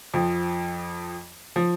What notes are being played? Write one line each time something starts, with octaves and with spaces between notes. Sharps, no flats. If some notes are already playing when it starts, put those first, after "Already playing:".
F2 F3
F3